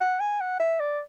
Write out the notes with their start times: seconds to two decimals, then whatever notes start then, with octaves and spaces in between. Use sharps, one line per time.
0.01 F#5
0.20 G#5
0.40 F#5
0.59 E5
0.80 D5